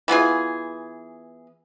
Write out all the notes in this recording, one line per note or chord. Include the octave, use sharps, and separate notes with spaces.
E3 B3 F4 G#4